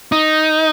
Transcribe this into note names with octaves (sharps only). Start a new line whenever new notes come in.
D#4